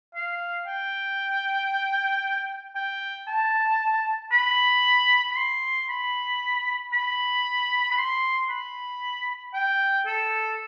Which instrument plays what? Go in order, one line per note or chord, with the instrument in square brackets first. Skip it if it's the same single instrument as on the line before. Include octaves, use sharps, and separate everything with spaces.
[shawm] F5
G5
G5
A5
B5
B5
C6
B5
B5
B5
C6
B5
G5
A4